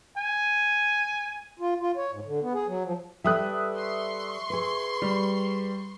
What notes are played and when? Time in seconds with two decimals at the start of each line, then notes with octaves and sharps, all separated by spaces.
0.18 G#5
1.60 F4
1.81 F4
1.97 C#5
2.12 G#2
2.25 D3
2.42 B3
2.54 G#4
2.67 F#3
2.84 F3
3.24 G3 A4 B4 E5 D#6 F#6
3.77 C6 C#6
4.50 G#4 B4
5.02 G3